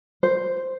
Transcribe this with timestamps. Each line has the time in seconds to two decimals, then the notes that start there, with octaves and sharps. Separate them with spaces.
0.23 C5